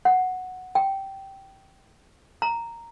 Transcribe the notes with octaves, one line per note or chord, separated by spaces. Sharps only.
F#5
G5
A#5